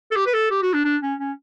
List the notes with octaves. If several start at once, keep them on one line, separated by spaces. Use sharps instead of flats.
A4
G4
B4
A4
G4
F#4
D4
D4
C#4
C#4